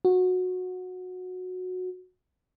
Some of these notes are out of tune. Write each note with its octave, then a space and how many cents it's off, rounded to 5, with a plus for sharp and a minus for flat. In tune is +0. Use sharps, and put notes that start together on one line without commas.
F#4 -15